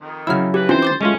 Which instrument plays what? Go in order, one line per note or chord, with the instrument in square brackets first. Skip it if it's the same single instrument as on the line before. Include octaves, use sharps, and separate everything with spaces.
[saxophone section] F2 D#3
[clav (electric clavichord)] C#3 F#3 E4 [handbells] E6 F6
[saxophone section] F2 E3 B4 [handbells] G4
[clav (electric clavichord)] E3 C4 [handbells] C#4 D#4 F4 [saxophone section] C5
[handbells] D6 G6 A6
[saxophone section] F#2 C#4 [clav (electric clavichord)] G#3 A3 F4